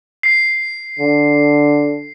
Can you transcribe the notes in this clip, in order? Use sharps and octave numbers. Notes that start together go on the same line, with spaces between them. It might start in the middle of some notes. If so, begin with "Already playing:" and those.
C7
D3